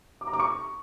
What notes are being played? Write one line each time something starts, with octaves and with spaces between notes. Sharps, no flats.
D6
A#5
D6
C#6